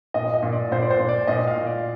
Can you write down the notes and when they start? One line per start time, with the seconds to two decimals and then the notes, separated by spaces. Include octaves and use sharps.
0.14 A#2 D#5
0.34 D#5
0.43 A#2
0.53 D5
0.72 A#2 C5
0.82 D5
0.91 C5
0.99 A#2
1.09 D5
1.27 A#2 D#5
1.47 F5
1.57 A#2
1.66 D5